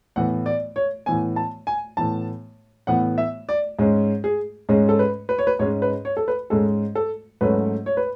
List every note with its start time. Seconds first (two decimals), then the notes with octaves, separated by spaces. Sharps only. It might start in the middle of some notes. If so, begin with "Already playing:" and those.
0.16 A2 E3 B3 F#5
0.46 D5
0.76 C#5
1.06 A2 E3 B3 G#5
1.36 A5
1.67 G#5
1.97 A2 E3 B3 A5
2.87 A2 E3 B3 F#5
3.18 E5
3.49 D5
3.79 G#2 G#3 C#4
4.24 G#4
4.69 G#2 G#3 C#4
4.89 A4
4.99 B4
5.29 B4
5.39 C#5
5.47 B4
5.59 G#2 G#3 C#4 C#5
5.82 B4
6.05 C#5
6.17 A4
6.28 B4
6.50 G#2 G#3 C#4 A4
6.95 A4
7.41 G#2 F#3 A3 C#4 B4
7.86 C#5
7.97 B4